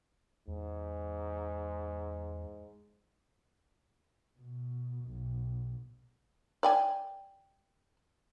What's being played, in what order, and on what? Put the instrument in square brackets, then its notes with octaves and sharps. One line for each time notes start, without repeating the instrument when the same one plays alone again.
[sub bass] E2 [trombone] G#2
[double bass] B2
B1
[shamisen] D5 G5 G#5